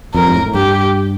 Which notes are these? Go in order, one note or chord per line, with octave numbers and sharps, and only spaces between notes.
F2 A#4
G2
A2
A2
G2 G4